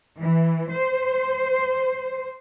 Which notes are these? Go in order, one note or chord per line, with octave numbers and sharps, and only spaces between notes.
E3
C5